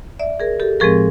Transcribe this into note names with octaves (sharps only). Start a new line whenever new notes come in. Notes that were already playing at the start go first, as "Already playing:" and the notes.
D5 E5
G#4 A#4
G4 A4
A2 F3 G#3 C4 G#4 A#4